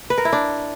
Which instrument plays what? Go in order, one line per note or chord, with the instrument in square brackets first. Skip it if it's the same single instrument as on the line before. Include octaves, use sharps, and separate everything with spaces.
[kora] B4
A#4
E4
D4